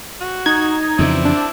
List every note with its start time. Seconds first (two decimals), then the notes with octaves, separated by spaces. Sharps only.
0.22 F#4
0.46 D#4 G#6
0.99 F2 C#3 E3 C4 E4 D5
1.25 D4